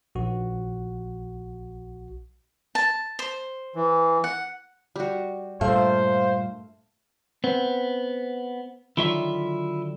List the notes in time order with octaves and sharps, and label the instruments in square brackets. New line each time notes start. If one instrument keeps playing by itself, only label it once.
[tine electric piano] A#1 F#4
[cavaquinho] A5
C5
[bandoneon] E3
[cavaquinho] F#5
[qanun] G3 F#4
[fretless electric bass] G2 A#2 [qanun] A3 [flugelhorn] C5 [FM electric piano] F5
[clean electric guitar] B3 [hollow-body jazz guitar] C4
[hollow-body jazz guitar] D3 D#3 F#3 [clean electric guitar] E4 F4 E5